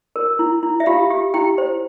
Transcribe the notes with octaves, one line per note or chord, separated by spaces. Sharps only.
A#4
E4
E4
E5
F4 G4 F5
G4
E4 G4 G5
C5